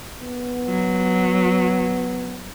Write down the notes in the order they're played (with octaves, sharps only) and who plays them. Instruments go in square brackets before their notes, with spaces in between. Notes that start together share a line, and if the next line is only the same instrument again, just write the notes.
[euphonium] B3
[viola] F#3